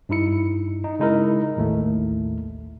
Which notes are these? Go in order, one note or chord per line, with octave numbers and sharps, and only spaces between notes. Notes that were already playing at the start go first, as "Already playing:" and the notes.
G2 D#4 E4 C#7
D#4
C#3 G#3 D#4 E4 A#4
A1 D#2 A2 A3